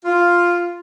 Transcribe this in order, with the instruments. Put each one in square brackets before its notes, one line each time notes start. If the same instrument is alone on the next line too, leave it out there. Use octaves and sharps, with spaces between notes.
[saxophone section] F4